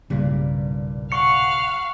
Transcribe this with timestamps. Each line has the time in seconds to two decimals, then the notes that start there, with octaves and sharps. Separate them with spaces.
0.10 B1 G2 A#2 C#3 G3
1.12 F5 F#5 C#6 C#7